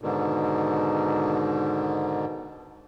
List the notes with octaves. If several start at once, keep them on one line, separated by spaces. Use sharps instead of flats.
G#2 B2 D3 D#3